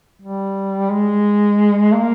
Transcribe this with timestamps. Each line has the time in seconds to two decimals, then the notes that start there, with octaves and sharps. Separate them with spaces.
0.22 G3
0.90 G#3
1.93 A#3